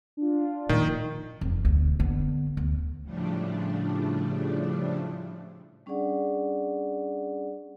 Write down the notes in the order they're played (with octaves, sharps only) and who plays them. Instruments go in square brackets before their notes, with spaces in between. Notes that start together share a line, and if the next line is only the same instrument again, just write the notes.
[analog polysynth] D4 F4
[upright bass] A#2 F3 [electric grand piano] D#3
[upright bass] F1
D2 B2
D3 B3
D2
[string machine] A2 C#3 F3 G3 A3 D4
[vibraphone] G3 C#4 D4 G#4 D5 F#5